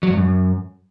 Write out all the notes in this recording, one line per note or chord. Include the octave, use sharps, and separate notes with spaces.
F#3
G2
F#2